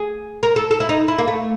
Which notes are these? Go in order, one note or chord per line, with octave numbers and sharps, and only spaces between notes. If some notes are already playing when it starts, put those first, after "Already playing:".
Already playing: G#4
A#4
A4
A4
E4
D#4
E4
A#3
A3